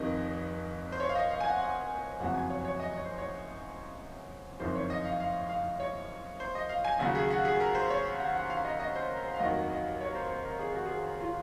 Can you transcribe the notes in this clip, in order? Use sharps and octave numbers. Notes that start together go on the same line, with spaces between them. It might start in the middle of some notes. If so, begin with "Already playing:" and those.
Already playing: F1 F2 D#3 D#5
C5
C#5
F5
D#5
F5
G#5
F#5
F#5
F#1 F2 C#3 F#3 F#5
G#5
C#5
C#5
D#5
C#5
C5
C#5
F#1 F2 D#3 C5
C#5
D#5
F5
F5
F5
C#5
C5
D#5
F5
G#5
D#2 C#3 F#3 F#5
G#4
F#4
G#4
A#4
C5
C#5
F#5
F#5
F5
D#5
D#5
C5
A#4
C5
F5
F1 D#2 D#3 F#3 D#5
D#5
C#5
A#4
C5
C5
A#4
G#4
F#4
G#4
F4